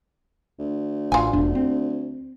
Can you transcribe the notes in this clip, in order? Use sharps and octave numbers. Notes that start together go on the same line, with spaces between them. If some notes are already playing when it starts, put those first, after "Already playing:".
D2
A1 F4 G#5
E1 D4
C4